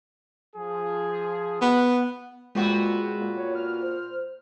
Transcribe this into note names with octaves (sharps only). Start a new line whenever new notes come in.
F3 G#4
B3 F#5
A#2 G#3 B3 C4 F#4
A#2
C#5
F6
C5